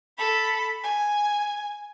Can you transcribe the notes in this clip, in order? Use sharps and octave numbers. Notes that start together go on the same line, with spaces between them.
A4 B5
G#5